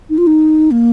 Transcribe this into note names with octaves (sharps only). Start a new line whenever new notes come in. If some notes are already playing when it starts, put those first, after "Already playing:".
D#4
F4
D#4
A#3